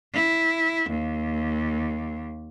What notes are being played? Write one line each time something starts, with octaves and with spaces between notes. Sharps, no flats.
E4
D#2